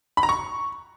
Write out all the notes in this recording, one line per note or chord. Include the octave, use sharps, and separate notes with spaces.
B5
A#5
C#6